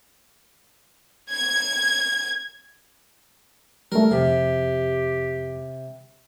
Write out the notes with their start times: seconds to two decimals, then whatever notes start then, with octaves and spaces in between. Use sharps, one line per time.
1.32 G#6
3.92 G3 A3 A#4
4.11 F2 C3 G4